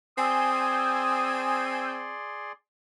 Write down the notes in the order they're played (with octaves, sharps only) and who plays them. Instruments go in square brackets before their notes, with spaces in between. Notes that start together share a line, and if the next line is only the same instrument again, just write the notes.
[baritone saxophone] C4 [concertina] G#4 D5 C6 [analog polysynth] G#5 E6 G6 [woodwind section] D#6